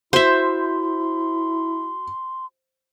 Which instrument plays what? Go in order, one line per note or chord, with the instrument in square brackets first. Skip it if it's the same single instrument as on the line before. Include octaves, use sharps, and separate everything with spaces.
[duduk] E4 [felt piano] F#4 [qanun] C5 E5 [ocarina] C6